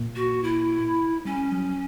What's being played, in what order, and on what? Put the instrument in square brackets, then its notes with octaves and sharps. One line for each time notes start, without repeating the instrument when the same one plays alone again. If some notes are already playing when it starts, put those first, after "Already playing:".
Already playing: [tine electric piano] A#2 A#3
[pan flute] F#4
E4
[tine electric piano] G3 [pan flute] C#4
[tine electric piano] F#3